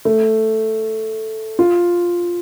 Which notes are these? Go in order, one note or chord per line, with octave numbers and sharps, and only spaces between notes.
A3
F4